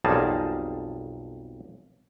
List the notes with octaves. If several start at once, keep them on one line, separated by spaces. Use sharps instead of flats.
B1 F2 G3 G#4 A#4 A5